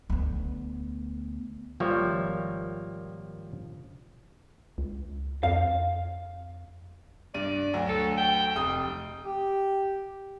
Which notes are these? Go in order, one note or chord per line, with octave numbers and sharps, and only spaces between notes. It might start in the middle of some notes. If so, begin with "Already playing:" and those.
D2 B3
G#1 F3 G3 A#3 C#5 E5
C#2
F2 F5
G2 D5 D#7
D2 F#3
A4
G5
F1 D#6
G4